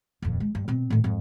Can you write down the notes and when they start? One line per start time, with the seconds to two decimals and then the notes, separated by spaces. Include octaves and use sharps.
0.22 D#1 F2
0.40 G#3
0.55 G2
0.68 B2 C4
0.90 A2 D#3
1.04 F2 G#2